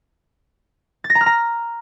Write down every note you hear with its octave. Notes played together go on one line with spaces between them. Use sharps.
A6
A#6
A#5
F6
A#5